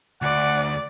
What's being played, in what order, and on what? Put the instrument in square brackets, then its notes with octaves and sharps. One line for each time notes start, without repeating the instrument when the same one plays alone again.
[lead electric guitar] D2 [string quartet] D5 [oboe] F#5